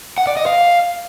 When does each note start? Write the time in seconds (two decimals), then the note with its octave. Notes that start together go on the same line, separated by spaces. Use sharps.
0.18 F#5
0.27 D5
0.37 D#5
0.46 F5